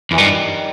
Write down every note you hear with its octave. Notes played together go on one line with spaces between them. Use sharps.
E2 E3
G2 D#3 G3